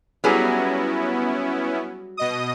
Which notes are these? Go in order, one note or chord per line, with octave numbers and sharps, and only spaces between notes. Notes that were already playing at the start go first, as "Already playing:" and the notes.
F#3 G3 B3 C#4 E4 G#4
B2 D#5 D#6